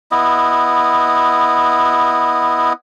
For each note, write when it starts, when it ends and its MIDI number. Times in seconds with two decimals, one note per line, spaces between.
0.11 2.73 59
0.11 2.73 64
0.11 2.73 75